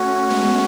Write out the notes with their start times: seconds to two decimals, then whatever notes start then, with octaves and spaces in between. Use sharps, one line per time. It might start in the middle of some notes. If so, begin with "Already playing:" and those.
Already playing: A3 C#4 F#4
0.30 G#3 B3